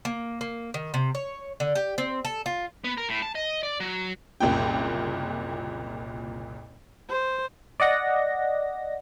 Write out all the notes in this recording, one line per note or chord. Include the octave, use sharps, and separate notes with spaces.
A#3
A#3
D#3
C3
C#5
D3
G4
C4
A4
F4
B3
A#4
A2
A5
D#5
D5
F#3
F#1 C2 A#2 G5
C5
D5 D#5 F#5 A#6